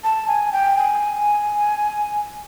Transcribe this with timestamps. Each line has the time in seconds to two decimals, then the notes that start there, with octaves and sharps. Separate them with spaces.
0.04 A5
0.28 G#5
0.52 G5
0.77 G#5